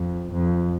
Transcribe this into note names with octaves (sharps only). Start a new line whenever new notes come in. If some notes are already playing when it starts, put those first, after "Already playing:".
Already playing: F2
F2